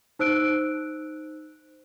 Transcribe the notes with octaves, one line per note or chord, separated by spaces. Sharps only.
D#4 C5 E6 F#6 D7